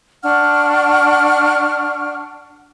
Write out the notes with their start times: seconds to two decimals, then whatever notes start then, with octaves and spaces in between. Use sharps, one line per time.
0.23 D4 F#5 C#6 F6